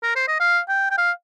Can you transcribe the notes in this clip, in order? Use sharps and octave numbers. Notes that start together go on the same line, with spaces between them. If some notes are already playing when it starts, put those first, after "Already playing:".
A#4
C5
D#5
F5
G5
G5
F5